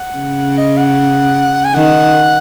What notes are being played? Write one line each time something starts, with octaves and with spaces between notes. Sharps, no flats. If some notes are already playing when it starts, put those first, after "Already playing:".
Already playing: F#5
C#3
D#5
F#5
G#5
D#3 F#5